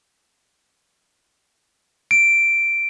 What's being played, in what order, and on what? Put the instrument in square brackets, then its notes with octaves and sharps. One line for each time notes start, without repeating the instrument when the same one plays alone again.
[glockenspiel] D7